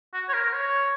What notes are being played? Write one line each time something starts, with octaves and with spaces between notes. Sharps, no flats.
F#4
C#5
A#4
A#4
C#5